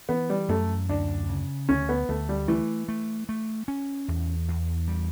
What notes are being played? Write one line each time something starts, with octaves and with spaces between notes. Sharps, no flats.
E3 B3
G3
F#2 A3
D2 D4
C#3
D2 C#4
B3
D2 A3
G3
E3 A3
A3
A3
C#4
E2
E2
G3